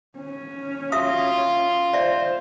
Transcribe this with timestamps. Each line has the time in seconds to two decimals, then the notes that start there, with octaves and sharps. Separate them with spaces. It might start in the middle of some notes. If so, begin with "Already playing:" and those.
0.17 C#4
0.92 F4 F#4 E5 D#6
1.93 C5 D5 E5